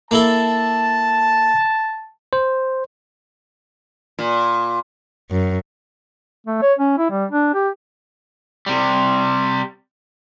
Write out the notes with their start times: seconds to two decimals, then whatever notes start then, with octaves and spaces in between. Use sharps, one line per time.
0.11 A#3 E4 A4 A5
2.33 C5
4.19 A#2
5.31 F#2
6.46 A3
6.62 C#5
6.78 C#4
6.98 E4
7.10 G3
7.31 D4
7.54 G4
8.66 C3 G3